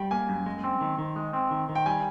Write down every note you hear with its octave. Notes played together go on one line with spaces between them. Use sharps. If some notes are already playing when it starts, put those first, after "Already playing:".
Already playing: G3 G5
A#3 G#5
F#2
G#3
C4
D#3
D#3
G#3
C4
D#3
D#3
G5
G3 G#5